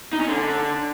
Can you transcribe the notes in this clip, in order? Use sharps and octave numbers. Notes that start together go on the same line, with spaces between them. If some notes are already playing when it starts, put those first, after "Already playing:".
D#4
C#4
D3